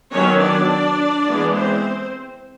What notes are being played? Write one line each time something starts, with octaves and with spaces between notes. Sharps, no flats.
D#3 F#3 B3 C#4 C#5
D4 D5
E3 G#3 B3
C4 C5